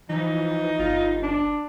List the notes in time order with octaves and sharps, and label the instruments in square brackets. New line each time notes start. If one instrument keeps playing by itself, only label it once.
[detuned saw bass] E3 [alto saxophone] F3 [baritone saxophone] D#4
[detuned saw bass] G1 [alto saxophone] F4
[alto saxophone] D4